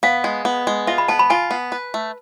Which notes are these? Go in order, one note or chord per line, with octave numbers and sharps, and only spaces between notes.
B3 F5
G#3
B3
G#3
F4 E5
B5
B3 A5
B5
F4 G#5
B3
B4
A3